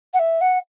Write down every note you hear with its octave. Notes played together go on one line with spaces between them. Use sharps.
F#5
E5
F#5